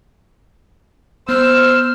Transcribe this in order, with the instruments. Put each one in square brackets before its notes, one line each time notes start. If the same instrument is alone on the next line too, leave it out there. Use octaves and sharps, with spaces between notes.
[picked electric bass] B3 [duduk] C5 [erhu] E6 [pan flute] F6